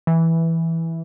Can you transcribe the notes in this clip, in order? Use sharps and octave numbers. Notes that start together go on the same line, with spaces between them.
E3